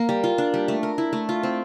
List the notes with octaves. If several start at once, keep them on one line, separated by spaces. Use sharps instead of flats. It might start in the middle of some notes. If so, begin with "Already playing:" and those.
Already playing: A#3 A#4
G3
F4
D4
G3
A3
A#4
E4
A3
F4
C4